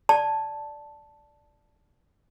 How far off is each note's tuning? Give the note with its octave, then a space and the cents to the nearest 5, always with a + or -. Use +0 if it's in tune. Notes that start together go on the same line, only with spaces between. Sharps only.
D5 +0 A5 +0